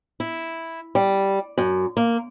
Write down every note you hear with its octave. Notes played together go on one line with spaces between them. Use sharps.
E4
G3
F#2
A#3